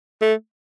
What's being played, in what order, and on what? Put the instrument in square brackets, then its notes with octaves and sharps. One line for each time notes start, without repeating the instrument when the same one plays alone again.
[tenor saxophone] A3